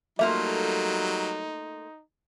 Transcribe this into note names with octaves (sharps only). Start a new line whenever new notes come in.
F#3 G3 A3 A#3 D#4 F4 E5